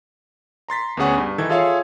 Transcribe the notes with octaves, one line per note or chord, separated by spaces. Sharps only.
A#5 C6 A6 B6
D2 B3 C#4 G#4 F#5 C#6
G2
D#3 E3 A4 G#6
F4 G#4 A4 C#5 E5 F5